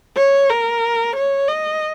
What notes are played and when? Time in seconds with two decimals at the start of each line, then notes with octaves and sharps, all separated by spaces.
0.16 C#5
0.50 A#4
1.16 C#5
1.48 D#5